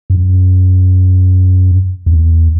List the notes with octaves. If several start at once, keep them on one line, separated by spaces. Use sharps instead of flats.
F#2
E2